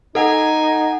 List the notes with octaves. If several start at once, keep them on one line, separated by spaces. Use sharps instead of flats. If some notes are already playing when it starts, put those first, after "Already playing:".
D#4 A4 F#5 G#5